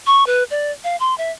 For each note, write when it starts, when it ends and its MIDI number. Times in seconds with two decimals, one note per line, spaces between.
0.07 0.26 85
0.27 0.44 71
0.51 0.72 74
0.84 0.96 77
1.00 1.16 84
1.18 1.31 76